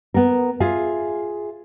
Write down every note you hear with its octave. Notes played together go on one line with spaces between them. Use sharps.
B3 A#4
F4 G#4 E5